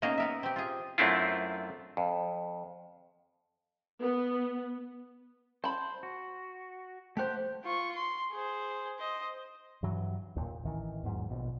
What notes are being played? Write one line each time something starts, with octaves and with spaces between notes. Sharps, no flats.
A#3 B3 C#4 D#4 G#4 A#4
B3 A#4 E5
C4 G4
F4 G#4
F#2 A3 C4 D4 E4 F4
F2
B3
C5 A5 B5
F#4
A3 G4 C5 F#5 G6
F4 C#6
C6
G#4 C5
C5 D#5
G2 E3 F#3
D#2 A#2
A1 D#3 E3
E2 G#2 F#3
A#1 B2